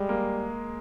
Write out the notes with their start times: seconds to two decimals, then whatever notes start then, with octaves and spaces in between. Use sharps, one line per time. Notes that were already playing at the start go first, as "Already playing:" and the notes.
Already playing: G3 G#3
0.09 A#3